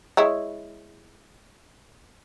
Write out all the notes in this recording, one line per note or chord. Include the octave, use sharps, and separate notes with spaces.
G#3 E4 C#5